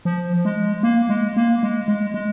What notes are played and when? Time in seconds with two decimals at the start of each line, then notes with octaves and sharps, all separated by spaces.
0.05 F3
0.45 G#3
0.83 A#3
1.09 G#3
1.37 A#3
1.63 G#3
1.88 G#3
2.14 G#3